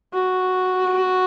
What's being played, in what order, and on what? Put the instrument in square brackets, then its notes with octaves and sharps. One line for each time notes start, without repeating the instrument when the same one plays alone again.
[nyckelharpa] F#4